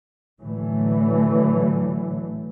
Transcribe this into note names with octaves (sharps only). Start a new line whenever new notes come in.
A2 D3 E3 F#3 A3